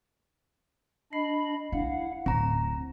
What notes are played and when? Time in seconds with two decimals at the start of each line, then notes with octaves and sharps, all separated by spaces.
1.13 D4 D#5 B5 C7
1.72 D4 E4 F5 F#5
2.26 D1 A2 C4 A#5